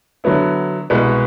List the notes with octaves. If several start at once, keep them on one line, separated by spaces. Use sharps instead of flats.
D3 F#3 B3 E4
C2 B2 G#3 B3